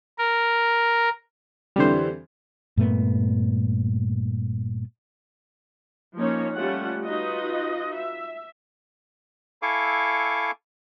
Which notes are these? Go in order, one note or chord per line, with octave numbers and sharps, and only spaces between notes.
A#4
F2 D3 E3 G3 C5
G2 A#2 A3 B3
F3 A#3 C#4 D#4 C#5
G3 A3 C#4 F4 F#5
D#4 F4 F#4 B4 D#5
E5
E4 A4 F5 G#5 C#6 D6